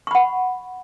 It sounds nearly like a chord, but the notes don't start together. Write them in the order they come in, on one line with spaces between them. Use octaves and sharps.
C#6 B5 F#5